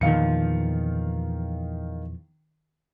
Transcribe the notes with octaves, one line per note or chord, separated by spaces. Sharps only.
E2 A#2 D#3 F3 F5 C#7